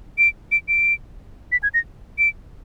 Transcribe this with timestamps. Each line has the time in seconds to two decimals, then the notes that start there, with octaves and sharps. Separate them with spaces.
0.18 D7
0.52 D7
0.68 D7
1.52 B6
1.63 G#6
1.74 A#6
2.19 D7